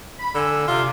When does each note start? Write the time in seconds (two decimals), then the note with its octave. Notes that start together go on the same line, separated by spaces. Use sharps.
0.19 B5
0.35 D3 G#5 E6
0.67 C3 F4